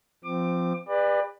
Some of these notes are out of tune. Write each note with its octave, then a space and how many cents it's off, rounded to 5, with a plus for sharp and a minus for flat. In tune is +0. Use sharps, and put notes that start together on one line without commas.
F3 +0 C4 -15 D6 +25
G4 +45 B4 +0 D5 +25